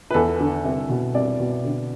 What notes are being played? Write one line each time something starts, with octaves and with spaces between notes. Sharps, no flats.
B4
E2 A4
D3
C2
B2
C2 D5
B2
D3